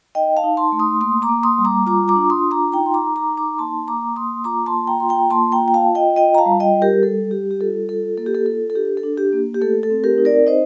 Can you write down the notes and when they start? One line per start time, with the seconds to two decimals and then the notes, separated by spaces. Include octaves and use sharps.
0.15 D#4 D#5 G5
0.37 F5 A5
0.44 D#4
0.57 A5 C6
0.72 A3
0.79 C6 D#6
1.01 A#3 C6 D#6
1.22 A#5 D6
1.29 A#3
1.43 C6 D#6
1.58 G3
1.65 A#5 D6
1.86 F4 A#5 D6
2.08 A#5 D6
2.16 D4
2.30 C6 D#6
2.44 F4
2.51 A#5 D6
2.72 D#4 G5 A#5
2.86 C6
2.94 A#5 D6
3.02 D#4
3.16 A#5 D6
3.30 D#4
3.37 A#5 D6
3.58 A#3 A5 C6
3.88 A#3 A#5 D6
4.16 A#3 C6 D#6
4.44 F4 A#5 D6
4.66 A5 C6
4.73 A#3
4.87 G5 A#5
5.00 F4 C6
5.09 G5 A#5
5.30 A#3 A5 C6
5.52 G5 A#5
5.60 F4
5.68 G5
5.74 F5 A5
5.88 F4
5.95 D#5 G5
6.16 F4 D#5 G5
6.35 A#5
6.38 F5 A5
6.46 G3
6.60 D#5 G5
6.75 G3
6.82 G4 A#4
7.03 G3 A4
7.31 G3 G4
7.51 G4
7.60 F4 A4
7.89 F4 A4
8.17 A#3 A4
8.26 G4
8.35 A4
8.46 F4 A4
8.70 A4
8.75 D4 G4
8.97 A4
9.04 D4
9.18 G4
9.33 A#3
9.54 G4
9.61 A3 A4
9.83 A4
9.90 C4
10.04 G4 A#4
10.18 D#4
10.25 A#4 D5
10.47 D#4 C5 D#5